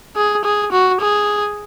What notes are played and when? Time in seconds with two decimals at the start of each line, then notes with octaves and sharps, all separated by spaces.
0.16 G#4
0.44 G#4
0.72 F#4
1.01 G#4